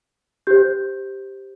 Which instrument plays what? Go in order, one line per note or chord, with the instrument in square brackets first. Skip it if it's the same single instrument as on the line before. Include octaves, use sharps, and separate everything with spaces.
[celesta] G4 C5 G6